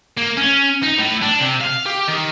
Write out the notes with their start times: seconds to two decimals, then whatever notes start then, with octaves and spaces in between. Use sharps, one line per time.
0.17 A#3
0.37 C#4
0.83 D#4
0.99 A2
1.22 D4
1.40 C3
1.61 F5
1.86 G4
2.08 D#3